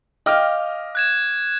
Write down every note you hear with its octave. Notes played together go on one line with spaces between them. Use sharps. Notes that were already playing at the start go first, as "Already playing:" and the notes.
D#5 F5 G5 D6 F6
F#6 G#6 E7